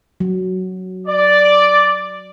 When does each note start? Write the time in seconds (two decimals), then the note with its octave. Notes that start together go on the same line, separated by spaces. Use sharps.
0.20 F#3
1.07 D5